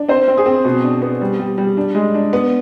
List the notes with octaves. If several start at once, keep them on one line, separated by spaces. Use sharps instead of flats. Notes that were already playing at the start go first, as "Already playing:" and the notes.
Already playing: D4
C4 C5
C4
G#4
C4
B2
D4
B3
G3
G3
G3
D4
G#3
D4
B3